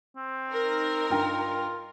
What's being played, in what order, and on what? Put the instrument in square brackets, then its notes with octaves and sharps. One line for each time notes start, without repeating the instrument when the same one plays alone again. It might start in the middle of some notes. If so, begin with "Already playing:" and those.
[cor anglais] C4
[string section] D#4 A#4
[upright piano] G2 G5 A#5 [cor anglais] F4